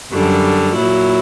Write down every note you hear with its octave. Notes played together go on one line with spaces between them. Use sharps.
F#2 D3 G3
A#2 F#3 E4